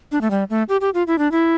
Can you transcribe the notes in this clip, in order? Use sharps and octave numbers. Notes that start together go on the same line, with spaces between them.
D4
A3
G3
A3
G4
G4
F4
E4
D4
E4